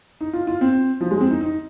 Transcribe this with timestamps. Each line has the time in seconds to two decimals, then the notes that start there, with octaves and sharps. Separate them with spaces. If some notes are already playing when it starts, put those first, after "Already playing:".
0.21 D#4
0.33 F4
0.47 F4
0.61 C4
1.01 F3
1.11 G#3
1.21 C4
1.31 D#4
1.41 D#4